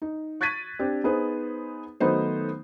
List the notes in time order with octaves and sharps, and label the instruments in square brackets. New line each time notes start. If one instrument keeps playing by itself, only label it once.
[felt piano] D#4
C#6 F#6 G#6 A6 B6 D#7
C4 D4 G4
B3 D#4 G#4 B4 C5
D#3 F#3 A3 B3 D#4 C5